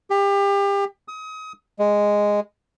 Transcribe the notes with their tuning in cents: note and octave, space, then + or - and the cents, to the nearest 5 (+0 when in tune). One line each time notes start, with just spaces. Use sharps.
G4 +30
D#6 +30
G#3 -5